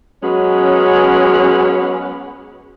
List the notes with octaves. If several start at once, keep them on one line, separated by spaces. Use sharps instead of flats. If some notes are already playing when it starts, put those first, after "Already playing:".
F#3 G#3 B3 C#4